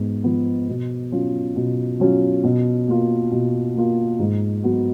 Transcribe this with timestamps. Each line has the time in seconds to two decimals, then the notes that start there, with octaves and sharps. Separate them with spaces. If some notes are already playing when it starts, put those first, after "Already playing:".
Already playing: G#2 B3
0.24 F3 B3
0.68 B2
1.12 F#3 C#4 F4
1.56 B2
2.00 F#3 C#4 F4
2.44 B2
2.88 A#3 F4
3.31 B2
3.76 A#3 F4
4.19 G#2
4.63 F#3 B3 F#4